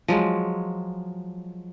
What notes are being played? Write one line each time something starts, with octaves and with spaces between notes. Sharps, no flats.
F3 F#3 G#3